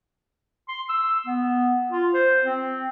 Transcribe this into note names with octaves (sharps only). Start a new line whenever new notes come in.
C6
E6
B3
F4
C5
C4